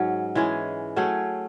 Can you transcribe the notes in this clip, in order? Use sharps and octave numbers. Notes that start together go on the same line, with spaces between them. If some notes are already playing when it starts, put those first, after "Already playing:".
Already playing: G#2 F#3 C#4
E3 G#3 C#4 G#4
F#3 A3 C#4 G#4